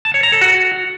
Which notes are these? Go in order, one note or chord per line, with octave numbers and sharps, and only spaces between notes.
A5
C#5
A#5
A4
F#4